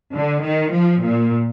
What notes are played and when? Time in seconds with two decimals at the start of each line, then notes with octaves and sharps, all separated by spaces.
0.13 D3
0.42 D#3
0.72 F3
1.02 A#2